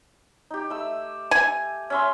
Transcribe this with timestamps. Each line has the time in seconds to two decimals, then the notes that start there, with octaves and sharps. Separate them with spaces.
0.50 D#4 G4
0.70 A3 E6
1.31 G#5
1.90 C#4 E5 C6